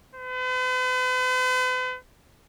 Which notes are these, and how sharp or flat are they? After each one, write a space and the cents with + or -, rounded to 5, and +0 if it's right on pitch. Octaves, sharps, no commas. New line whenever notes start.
B4 +45